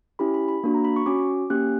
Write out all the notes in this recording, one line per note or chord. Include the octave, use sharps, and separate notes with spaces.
C#4 E4 G4 B5
B5
B5
A#3 D4 F#4
A#5
B5
C#6
C#4 F#4 D6
A#3 C#4 G4 F#6